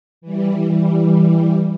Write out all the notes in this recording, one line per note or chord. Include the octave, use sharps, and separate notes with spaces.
E3 G3